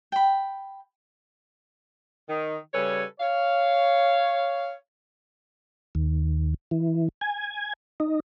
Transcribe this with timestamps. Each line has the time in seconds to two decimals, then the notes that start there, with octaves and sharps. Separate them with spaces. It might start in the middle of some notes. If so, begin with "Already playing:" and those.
0.12 G5 B5
2.28 D#3
2.73 C#3 G3 A4 B4 C#5 G#5
3.20 C#5 F5
5.95 D#2
6.71 E3
7.21 G#5
8.00 D#4